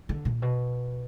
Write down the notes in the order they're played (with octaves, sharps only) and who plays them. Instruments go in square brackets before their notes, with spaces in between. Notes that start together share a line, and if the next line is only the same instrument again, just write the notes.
[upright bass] D3
A#2
B2